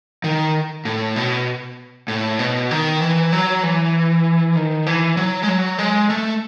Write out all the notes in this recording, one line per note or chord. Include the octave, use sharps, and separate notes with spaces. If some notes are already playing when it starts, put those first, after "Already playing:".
D#3
A2
B2
A2
B2
D#3
E3
F#3
E3
D#3
E3
F#3
G#3
F#3
G#3
A3